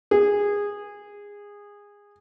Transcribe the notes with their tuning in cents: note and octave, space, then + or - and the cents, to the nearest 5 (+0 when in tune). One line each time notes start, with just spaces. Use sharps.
G#4 -20